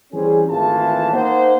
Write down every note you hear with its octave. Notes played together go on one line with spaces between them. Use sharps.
E3 G3 C4 C#4 G#4
G#1 E3 A3 F4 A4 A5
A#3 D#4 C5 F#5